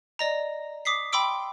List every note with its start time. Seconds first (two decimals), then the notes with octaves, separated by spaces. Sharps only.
0.19 D5 D#5 A#5
0.85 D6 D#6 B6 C7
1.13 G5 B5 C6 D6 E6 D7